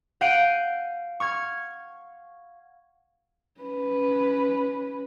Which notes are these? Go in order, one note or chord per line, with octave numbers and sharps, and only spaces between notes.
F5 F#5 G6 D7 D#7
C#6 F6 G#6
C#4 B4